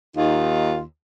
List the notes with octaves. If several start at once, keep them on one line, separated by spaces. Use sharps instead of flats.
D#2 D#4 F4